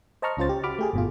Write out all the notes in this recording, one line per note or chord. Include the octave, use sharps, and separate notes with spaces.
C5 D#5 A5 A#5 C#6 F6
C#2 C#4 F4 C5 A6
G4
F#4 B5 D6 F6
A3 G4 G#4
G1 B2 F4